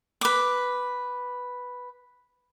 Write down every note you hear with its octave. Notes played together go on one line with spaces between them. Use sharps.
B4 D6